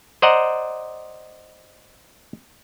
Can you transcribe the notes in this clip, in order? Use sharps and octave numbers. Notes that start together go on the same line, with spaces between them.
C5 D5 D#5 F#5 A#5